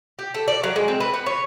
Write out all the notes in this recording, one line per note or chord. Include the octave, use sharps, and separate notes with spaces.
G4
A4
D5
F#3
G#3
C4
B4
B3
C#5